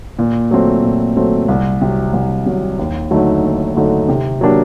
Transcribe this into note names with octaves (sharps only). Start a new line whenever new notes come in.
A#2
F#3 A3 C4
A#2
F#3 A3 C4
C2
C3 F#3
C2
C3 F#3
D#2
D3 F#3 A3 D#4
D#2
D3 F#3 A3 D#4
C3
F#3 A#3 D4 G4